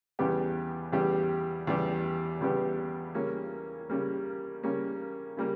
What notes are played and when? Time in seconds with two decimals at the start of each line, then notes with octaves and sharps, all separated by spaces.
0.19 E2 C#3 G3 B3 G4
0.93 E2 C#3 G3 B3 G4
1.67 E2 C#3 G3 B3 G4
2.41 E2 C#3 G3 B3 G4
3.15 C#3 G3 A#3 C#4
3.90 C#3 G3 A#3 C#4
4.63 C#3 G3 A#3 C#4
5.37 C#3 G3 A#3